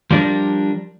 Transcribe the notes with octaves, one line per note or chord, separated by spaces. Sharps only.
F3 G3 D4 A#4